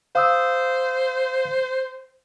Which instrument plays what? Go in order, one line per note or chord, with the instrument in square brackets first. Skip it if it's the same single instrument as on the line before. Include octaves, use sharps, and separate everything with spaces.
[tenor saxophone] C5 [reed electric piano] F5 D#6 E6